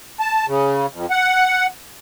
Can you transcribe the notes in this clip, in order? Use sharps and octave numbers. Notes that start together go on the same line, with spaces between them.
A5
C#3
F2
F#5